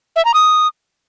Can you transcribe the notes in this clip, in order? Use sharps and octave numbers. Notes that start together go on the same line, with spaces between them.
E5
A#5
D#6